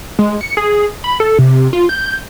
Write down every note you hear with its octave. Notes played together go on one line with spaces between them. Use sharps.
G#3
C#7
G#4
B5
A4
C3
F4
G6